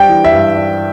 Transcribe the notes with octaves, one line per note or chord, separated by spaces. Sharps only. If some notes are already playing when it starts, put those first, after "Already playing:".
Already playing: G3 D4 G5
E3
E5
G2
D4